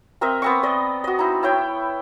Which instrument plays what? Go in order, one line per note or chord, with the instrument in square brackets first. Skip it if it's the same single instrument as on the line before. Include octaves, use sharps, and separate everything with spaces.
[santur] C4 A#4 D#5 E5
B3 C4 C#6
D5 D#5
F#4 D#5
D#4 E4
E4 C#5 G5